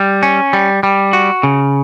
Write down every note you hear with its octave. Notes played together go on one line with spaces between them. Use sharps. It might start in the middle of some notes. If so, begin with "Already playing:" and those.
Already playing: G3
C#4
G3
G3
F#4
C#3